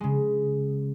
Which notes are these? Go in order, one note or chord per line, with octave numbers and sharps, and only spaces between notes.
C#3 G#3